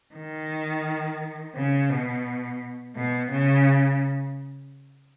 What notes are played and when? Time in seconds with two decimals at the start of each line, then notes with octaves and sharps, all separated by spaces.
0.15 D#3
1.55 C#3
1.90 B2
2.96 B2
3.31 C#3